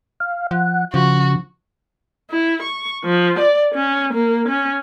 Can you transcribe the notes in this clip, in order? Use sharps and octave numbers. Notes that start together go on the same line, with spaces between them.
F5
F3 F#5
C#3 F3 F#4
E4
C#6
F3
D5
C#4
A#3
C#4